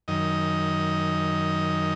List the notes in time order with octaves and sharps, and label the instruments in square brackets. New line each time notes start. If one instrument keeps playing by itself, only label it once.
[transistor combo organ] F#2 D#3 D#5